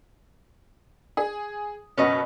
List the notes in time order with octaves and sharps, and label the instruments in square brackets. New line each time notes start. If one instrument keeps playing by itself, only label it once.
[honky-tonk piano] G#4
[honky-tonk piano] F#1 B2 F#5 [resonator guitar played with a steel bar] C#4 B4 D#5